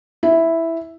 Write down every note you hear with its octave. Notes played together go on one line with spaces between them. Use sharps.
E4